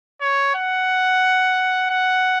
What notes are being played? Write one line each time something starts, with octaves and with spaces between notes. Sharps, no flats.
C#5
F#5
F#5